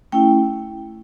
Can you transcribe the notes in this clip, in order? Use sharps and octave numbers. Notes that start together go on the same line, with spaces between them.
A3 C#4 E4 G5